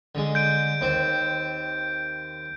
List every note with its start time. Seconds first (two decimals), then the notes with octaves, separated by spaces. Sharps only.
0.15 D3 G#3
0.35 G6 D7
0.81 D#2 C4 C5